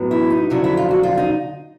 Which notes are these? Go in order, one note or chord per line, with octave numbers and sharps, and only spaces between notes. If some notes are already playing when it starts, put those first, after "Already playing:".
Already playing: A2 F#3 B3
E4
D#4
F2 D3 F#3 E4
E4
F4
F#4
F4
D#4